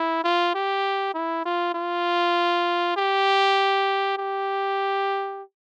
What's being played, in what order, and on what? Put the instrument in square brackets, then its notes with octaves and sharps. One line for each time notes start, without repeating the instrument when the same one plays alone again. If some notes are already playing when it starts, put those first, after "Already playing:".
Already playing: [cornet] E4
F4
G4
E4
F4
F4
G4
G4